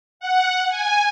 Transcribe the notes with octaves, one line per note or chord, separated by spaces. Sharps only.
F#5
G#5